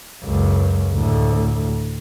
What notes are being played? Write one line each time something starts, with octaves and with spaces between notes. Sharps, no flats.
C#2 F#2
D2 A2